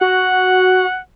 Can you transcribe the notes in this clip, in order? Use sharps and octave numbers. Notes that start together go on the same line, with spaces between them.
F#4 F#5